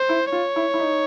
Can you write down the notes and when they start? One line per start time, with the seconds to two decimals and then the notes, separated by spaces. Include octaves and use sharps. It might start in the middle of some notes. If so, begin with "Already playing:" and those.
Already playing: C5
0.09 E4
0.32 F4 C#5
0.56 E4
0.74 E4
0.79 D#4